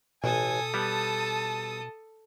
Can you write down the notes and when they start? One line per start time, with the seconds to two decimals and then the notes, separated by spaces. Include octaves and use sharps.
0.24 A1 B2 A4 G#5 D#6
0.74 G3 B3 A5